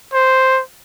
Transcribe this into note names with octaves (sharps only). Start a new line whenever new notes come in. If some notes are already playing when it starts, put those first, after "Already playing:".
C5